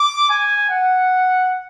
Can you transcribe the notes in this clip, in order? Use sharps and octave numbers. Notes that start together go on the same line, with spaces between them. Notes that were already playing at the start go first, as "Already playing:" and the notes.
Already playing: D6
G#5
F#5